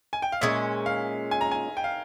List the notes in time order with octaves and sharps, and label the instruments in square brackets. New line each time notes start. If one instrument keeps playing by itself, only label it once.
[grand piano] G#5
G5
F5
[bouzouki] A#2 G#3 C#4 [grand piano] E5
[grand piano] F5
G#5
A#5
G#5
G5
F5